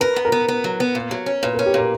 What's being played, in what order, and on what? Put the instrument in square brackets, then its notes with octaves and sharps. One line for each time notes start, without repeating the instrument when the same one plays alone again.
[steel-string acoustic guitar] A#4 [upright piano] B4
[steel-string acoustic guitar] B3
[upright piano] A#4
[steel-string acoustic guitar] B3
B3
F#3
B3
A#2
F#3
C#4
[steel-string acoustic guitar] A#2 [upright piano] B4
[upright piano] A#4
[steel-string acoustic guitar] C#4
[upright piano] G4
[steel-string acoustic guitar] A#2 [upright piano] A#4